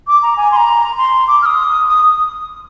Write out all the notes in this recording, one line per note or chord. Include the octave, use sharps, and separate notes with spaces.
D6
A#5
G#5
C6
A#5
C6
D6
F6
D#6
D#6